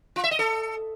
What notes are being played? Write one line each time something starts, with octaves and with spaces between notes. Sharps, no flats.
F4
E5
D#5
A4